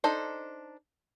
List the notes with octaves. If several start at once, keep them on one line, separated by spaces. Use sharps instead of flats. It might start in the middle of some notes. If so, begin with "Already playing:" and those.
D4 D#4 A4 C5